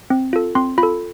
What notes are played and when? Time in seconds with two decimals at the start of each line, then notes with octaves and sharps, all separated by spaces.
0.10 C4
0.33 F4 A4
0.55 C4 C6
0.78 F4 B5
0.83 A4